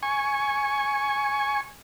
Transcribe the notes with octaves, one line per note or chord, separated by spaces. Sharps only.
G#5 C#6